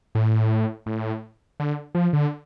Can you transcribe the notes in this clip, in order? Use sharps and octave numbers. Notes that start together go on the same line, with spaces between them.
A2
A2
D3
F3
D3